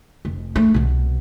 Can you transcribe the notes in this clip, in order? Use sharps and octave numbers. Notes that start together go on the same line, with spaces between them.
F1
A3
C2 B2